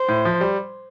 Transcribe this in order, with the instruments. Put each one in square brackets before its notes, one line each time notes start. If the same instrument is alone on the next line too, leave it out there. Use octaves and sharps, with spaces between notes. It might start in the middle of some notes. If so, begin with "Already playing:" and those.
Already playing: [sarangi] C5
[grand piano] A2
F3
G3